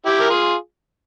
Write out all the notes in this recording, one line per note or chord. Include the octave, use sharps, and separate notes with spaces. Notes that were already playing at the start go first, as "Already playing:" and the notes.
E4 G4
A#4
F4 G#4